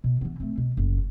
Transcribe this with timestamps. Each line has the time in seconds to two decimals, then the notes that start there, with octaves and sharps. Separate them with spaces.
0.04 B2
0.21 E3 B3
0.40 A3 C4
0.57 B2
0.77 F#1